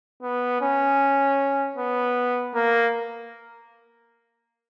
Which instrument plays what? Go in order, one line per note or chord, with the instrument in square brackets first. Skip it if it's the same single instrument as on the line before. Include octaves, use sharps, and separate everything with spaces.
[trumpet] B3
C#4
B3
A#3